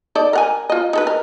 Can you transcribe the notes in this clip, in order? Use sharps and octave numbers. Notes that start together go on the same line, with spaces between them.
D#4 A4 D5
A#4 F#5 G#5
F4 D#5
D#4 A4 B4
A#4